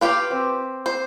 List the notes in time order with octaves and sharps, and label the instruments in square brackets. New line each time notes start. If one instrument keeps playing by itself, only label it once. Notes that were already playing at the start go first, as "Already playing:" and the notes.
[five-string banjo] F4 G4 F5 [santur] B4 D6
[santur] C4
[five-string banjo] C5